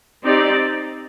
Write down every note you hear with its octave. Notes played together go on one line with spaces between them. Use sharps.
C4 D#4 G4 D5